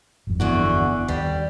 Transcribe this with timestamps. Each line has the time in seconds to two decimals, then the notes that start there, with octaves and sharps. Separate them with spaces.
0.27 G1 F2
0.40 E2 D3 F#4
1.08 D#2 G3